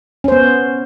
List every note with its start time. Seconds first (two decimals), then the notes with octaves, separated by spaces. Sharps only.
0.24 C#4
0.28 C5
0.32 B3